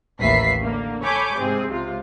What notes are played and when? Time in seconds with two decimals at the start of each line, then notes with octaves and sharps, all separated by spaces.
0.21 A1 D#2 B4 E5 B6 C7
0.62 D3 A#3
1.03 A4 C#5 G#5 B5 D6 G6
1.38 G#2 C3 C4 G#4
1.70 C#2 C3 F4